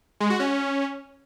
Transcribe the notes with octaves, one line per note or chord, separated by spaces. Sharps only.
G#3
F#4
C#4